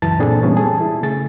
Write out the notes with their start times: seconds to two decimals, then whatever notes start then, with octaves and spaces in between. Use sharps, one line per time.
0.02 C#2 F#2 E3 A5 A6
0.19 A#2 C4 D4 G#4 A4
0.43 A#2 E3 G3 G#3 B3 C#4
0.57 G#4 A5
0.81 E4
1.03 C#3 A3 G#4 A6